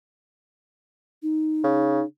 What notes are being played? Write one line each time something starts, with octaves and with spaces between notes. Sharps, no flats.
D#4
C#3